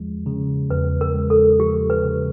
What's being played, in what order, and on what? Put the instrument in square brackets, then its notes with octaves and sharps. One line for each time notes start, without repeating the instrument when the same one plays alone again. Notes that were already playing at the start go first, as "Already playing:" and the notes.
Already playing: [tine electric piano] E2 F3 G#3
C#3
[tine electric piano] E2 [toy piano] B4
[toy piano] A#4
[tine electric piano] G#3
[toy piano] A4
[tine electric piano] F3 [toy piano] G4
[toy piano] B4
[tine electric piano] C#3